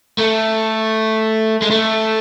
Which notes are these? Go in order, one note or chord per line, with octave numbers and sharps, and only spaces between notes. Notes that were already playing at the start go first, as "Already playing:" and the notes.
A3
G#3
A3